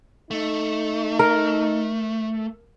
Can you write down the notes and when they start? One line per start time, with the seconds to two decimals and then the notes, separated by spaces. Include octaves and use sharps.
0.31 A3 D#4
1.19 A#4